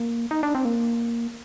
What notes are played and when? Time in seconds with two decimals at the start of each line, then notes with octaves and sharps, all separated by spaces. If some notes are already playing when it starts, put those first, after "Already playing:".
Already playing: A#3
0.31 D#4
0.43 D4
0.55 C4
0.65 A#3